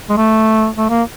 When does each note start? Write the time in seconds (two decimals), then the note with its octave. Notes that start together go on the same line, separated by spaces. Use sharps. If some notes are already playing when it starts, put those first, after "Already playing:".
0.10 G#3
0.17 A3
0.78 A3
0.90 A#3